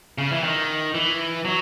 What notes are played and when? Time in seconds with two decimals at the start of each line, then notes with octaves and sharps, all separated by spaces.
0.18 C#3
0.31 E3
0.44 D#3
0.94 E3
1.45 F#3